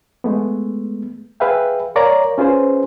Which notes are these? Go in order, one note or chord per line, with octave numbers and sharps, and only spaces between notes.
G#3 A3 B3
G#4 B4 E5 F5 G5
A#4 C#5 D5 F5 A#5
C#4 F4 G#4 B4 C5